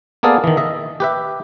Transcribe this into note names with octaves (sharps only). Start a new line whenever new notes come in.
A#3 B3 G#4 A4 D5 F5
D#3 E3
D#5 E5
G4 B4 E5